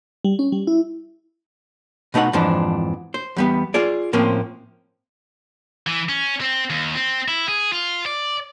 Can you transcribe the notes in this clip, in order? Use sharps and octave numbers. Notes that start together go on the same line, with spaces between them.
G3
C#4
G3
E4
B2 A3 D#4 C5 F#5
F2 G#2 E3 F3 D4
C5
E2 G3 B3
F4 G#4 D5
A2 F3 A#3 C4 C#4
E3
C#4
C4
D#2
C4
E4
G#4
F4
D5